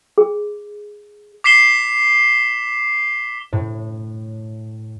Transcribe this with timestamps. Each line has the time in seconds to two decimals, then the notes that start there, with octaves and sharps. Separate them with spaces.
0.18 G#4
1.44 D6 B6 C7 E7 G7
3.53 A2